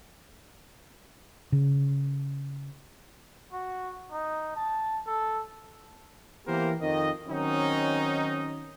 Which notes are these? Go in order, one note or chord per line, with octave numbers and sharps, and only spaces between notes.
C#3
F#4
D#4
A5
A4
E3 A#3 B3 G4 A#4 C5
F2 D#3 D#5
D#3 F#3 C4 C#4 D#4